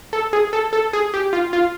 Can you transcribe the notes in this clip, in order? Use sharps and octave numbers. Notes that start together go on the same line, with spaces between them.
A4
G#4
A4
A4
G#4
G4
F4
F4